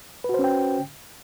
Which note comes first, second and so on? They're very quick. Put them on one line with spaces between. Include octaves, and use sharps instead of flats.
B4 F#4 C5 C#4 G5